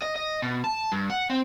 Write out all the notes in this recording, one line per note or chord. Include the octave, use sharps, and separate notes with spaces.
D#5
D#5
B2
A5
G2
F#5
C4